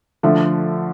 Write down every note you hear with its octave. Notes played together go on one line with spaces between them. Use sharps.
D3 F3 A3